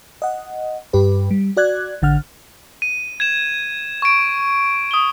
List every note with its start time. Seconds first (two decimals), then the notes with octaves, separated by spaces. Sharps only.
0.22 D#5 F#5
0.93 G2 G4 B4
1.31 G3
1.57 F#4 D5 F#6 G#6
2.02 A1 D3 F#5 F6
2.82 D#7
3.20 G#6 E7
4.02 C#6 D7
4.91 D#6 G7